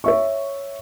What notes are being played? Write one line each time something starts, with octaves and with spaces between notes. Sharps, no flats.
C#5 E5 C#6